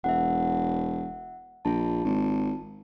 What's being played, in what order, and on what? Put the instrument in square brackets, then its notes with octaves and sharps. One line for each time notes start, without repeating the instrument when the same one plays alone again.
[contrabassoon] E1 [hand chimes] E5 F#5
[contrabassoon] A#1 [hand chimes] F4 A5
[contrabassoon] G#1